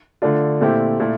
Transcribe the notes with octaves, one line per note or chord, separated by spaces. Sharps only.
D3 A3 D4 F4
A#2 A3 C4 E4 G4
A#2 A3 E4